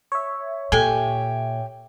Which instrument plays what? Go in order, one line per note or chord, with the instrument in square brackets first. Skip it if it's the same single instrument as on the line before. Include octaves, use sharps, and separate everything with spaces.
[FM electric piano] C#5 E5
[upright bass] A#2 [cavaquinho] G4 G#5 [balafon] A4